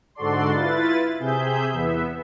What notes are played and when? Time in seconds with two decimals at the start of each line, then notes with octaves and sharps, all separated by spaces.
0.15 G#2 D3 F#4 A4 D5 C6
0.52 E4 F4 B4 A6
1.19 C3 G#4 E5 G6
1.73 E2 B3 E5